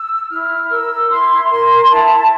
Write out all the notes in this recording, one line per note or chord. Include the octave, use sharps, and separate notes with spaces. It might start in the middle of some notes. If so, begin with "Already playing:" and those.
Already playing: E6
E4 F6
A#4 E6
E4 C6
A#4 C6
E4 A5